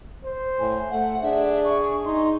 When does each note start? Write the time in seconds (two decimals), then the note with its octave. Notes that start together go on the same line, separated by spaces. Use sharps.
0.24 C5
0.59 A2 G#5
0.91 A3 F#5
1.23 D4 G#4 E5
1.65 C#6
2.05 D#4 C6